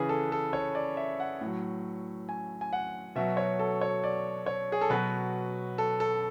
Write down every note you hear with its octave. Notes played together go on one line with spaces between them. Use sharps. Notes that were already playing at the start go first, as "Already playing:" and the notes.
Already playing: C#3 E3 G#4 B4
A4
A4
C#5
D5
E5
F#5
A2 F#3
G#5
G#5
F#5
B2 F#3 E5
C#5
A4
C#5
D5
C#5
G#4
A4
B2 F#3 B4
A4
A4